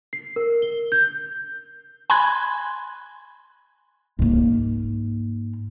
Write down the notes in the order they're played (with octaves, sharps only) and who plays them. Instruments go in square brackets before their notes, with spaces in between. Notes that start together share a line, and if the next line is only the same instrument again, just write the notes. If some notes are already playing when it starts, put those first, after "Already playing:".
[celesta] C7
A#4
G7
G6
[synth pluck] G#5 B5 C6 F#6 G#6
[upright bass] G#2 A#3